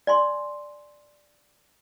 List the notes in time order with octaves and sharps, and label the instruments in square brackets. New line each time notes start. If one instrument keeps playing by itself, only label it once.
[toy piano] D5 G#5 C6